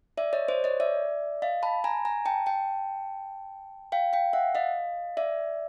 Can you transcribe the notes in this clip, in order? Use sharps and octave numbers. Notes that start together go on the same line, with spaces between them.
D5 E5
C#5 D#5
C5 D5
C#5 D#5
D5 E5
D#5 F5
A5 B5
G#5 A#5
G#5 A#5
G5 A5
G5 A5
F5 G5
F5 G5
E5 F#5
D#5 F5
D5 E5